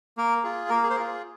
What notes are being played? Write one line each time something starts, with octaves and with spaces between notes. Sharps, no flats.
A#3 A#4
F4 G#4
A#3 A#4
G#4
C5
F4 G#4 A#4